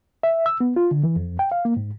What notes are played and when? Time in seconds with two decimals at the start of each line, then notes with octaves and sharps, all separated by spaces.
0.23 E5
0.46 E6
0.60 B3
0.76 F4
0.91 D3
1.04 E3
1.16 F2
1.39 G5
1.52 F5
1.65 A#3
1.77 G#2